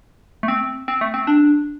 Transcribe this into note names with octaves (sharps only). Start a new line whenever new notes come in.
A3
C4
C4
A3
C4
D4